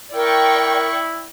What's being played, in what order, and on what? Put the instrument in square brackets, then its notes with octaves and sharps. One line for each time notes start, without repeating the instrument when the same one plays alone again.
[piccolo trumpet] E4 [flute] A#4 [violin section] D5 G5 C#6